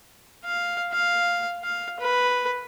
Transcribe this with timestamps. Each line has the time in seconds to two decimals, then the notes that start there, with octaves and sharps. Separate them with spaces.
0.44 F5
0.92 F5
1.64 F5
1.99 B4